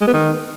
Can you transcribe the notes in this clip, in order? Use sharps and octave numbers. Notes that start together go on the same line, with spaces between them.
G#3
B3
D#3